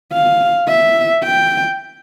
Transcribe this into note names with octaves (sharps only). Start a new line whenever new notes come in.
F5
E5
G5